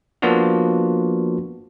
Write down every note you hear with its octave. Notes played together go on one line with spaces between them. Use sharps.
F3 A#3 B3 D4 F4 F#4